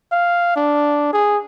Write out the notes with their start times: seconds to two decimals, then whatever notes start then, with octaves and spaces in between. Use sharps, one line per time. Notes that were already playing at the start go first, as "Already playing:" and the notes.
0.12 F5
0.56 D4
1.13 G#4